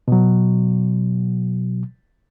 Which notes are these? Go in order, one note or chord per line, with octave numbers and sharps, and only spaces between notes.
B2 F#3